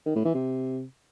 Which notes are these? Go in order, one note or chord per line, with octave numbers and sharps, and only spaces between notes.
D#3
A2
E3
C3